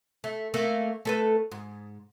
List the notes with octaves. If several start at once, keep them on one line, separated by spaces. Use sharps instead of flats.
A3
A3 A#3
A3 A4 B4
G#2